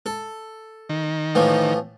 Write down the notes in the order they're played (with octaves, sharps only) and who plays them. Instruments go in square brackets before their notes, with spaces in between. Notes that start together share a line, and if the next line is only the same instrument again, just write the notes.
[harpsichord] A4
[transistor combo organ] D#3
[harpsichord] A2 E3 F3